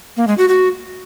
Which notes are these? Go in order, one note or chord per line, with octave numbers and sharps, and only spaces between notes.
A#3
G#3
F#4
F#4